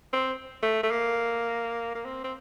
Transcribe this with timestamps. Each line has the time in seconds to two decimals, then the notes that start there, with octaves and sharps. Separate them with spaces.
0.13 C4
0.63 A3
0.83 A3
0.91 A#3
1.95 A#3
2.06 C4
2.24 C4